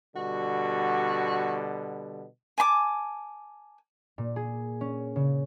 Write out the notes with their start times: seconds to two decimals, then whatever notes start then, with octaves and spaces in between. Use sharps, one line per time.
0.16 B2 D3 G3 F#4
2.58 G#5 A5 B5 D6
4.18 A#2
4.36 G#4
4.81 C#4
5.16 C#3